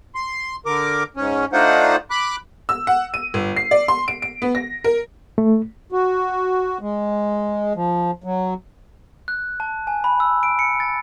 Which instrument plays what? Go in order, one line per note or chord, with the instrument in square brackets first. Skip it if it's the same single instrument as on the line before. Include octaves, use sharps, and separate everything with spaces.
[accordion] C6
D3 A#4 D6
G#2 C#4
A3 D4 D#4 F4 C5 F#5
B5 D6 F#6
[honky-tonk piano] E6
F#5
D#7
G1
C7
D5
C6
D7
D7
B3
A#6
A#4
[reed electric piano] A3
[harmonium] F#4
G#3
F3
F#3
[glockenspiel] F#6
A5
G#5
B5
E6
D7
C#7
A6